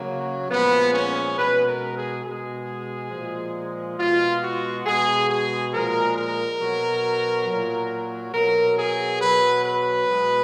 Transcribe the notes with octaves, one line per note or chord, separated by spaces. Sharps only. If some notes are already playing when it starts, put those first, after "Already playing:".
Already playing: C#3 F#3 A#3
A#2 F3 G#3 B3
C#4
B2 G#3 B4
A#4
G#4
B2 G#3 G#4
A#2 F3 G#3
B2 G#3 F4
F#4
B2 G#3 G#4
G#4
A#2 F3 G#3 A#4
A#4
B2 F#3
A#2 F#3
B2 F#3 A#4
G#4
B2 F#3 B4
B4
B2 G#3